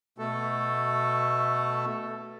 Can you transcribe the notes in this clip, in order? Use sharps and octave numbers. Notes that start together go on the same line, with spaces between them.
B2 A3 A4